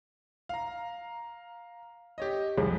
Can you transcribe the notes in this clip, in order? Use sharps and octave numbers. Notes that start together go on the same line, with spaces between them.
F5 A#5
G4 C#5 D#5
C2 F2 G#4